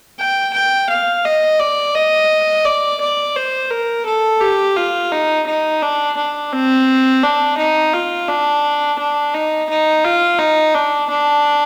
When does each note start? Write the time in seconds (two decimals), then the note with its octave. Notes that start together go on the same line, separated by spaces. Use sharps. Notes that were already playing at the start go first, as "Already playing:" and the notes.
0.19 G5
0.54 G5
0.89 F5
1.25 D#5
1.60 D5
1.96 D#5
2.65 D5
3.01 D5
3.36 C5
3.70 A#4
4.06 A4
4.41 G4
4.77 F4
5.12 D#4
5.47 D#4
5.82 D4
6.17 D4
6.52 C4
7.23 D4
7.58 D#4
7.93 F4
8.28 D4
8.99 D4
9.34 D#4
9.69 D#4
10.05 F4
10.39 D#4
10.75 D4
11.10 D4